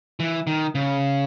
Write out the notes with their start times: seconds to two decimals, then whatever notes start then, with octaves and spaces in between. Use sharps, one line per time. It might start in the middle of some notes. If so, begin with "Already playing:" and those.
0.20 E3
0.47 D#3
0.75 C#3